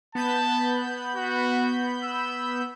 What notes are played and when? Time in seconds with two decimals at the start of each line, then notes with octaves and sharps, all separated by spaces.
0.15 B3 A5 B5 G6
1.16 F#4
2.04 E6